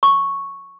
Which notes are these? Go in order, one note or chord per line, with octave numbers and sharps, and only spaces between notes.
C#6